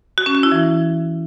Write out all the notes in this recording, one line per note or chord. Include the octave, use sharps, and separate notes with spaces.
F#4
C#4
F#4
E4
E3